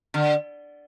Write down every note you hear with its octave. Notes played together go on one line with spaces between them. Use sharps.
D3